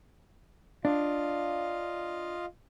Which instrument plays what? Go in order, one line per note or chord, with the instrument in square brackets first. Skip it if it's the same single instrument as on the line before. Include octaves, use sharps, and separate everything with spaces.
[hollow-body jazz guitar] D4 [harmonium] F4 D#5 F5